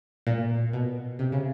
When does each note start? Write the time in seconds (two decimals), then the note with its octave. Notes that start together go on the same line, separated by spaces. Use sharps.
0.27 A#2
0.73 B2
1.19 C3
1.32 C#3